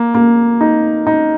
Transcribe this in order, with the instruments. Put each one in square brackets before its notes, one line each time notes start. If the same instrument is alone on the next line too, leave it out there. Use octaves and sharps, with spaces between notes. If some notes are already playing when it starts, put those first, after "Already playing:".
Already playing: [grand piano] A#3
A#3
D#4
D#4